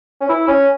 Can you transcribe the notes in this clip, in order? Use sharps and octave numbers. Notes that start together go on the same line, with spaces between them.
C#4
E4
C#4